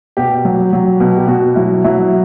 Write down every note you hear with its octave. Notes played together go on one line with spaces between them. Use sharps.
B2 G4
F#3
F#3
B2
G4
B2 F#4
F#3 E4
F#3 E4